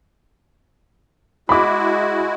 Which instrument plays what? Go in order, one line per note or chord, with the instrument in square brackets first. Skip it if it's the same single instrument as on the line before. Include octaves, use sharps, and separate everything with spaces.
[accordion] G#3 E4 F#4 [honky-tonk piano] B5 D6